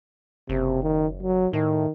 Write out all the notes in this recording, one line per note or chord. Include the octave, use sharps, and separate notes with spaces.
F#1 C3
D#3
F#3
A2 D#3